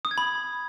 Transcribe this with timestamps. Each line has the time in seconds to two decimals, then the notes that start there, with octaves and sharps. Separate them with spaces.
0.05 D#6
0.11 G#6
0.18 B5